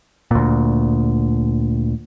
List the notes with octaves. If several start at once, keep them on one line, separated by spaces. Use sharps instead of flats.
D2 A#2